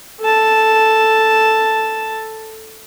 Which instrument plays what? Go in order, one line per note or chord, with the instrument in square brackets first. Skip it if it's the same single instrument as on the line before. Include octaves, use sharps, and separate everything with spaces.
[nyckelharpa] A4 A5